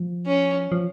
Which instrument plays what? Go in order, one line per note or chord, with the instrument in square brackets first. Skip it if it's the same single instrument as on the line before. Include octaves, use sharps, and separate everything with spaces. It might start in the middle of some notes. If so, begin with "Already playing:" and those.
Already playing: [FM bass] F3
[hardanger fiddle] C#4
[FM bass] F3